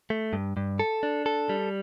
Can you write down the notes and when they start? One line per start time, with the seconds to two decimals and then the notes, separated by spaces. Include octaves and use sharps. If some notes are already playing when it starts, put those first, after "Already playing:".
0.10 A3
0.33 G2
0.57 G2
0.79 A4
1.03 D4
1.26 A4
1.49 G3